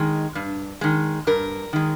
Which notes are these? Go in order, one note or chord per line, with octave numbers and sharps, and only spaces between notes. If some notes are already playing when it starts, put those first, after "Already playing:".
Already playing: D#3 G#3
G2
D#3 G#3
G2 A#4
D#3 G#3